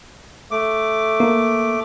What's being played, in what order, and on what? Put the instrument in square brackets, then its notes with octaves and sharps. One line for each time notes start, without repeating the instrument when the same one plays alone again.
[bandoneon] A3 D6
[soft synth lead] A#3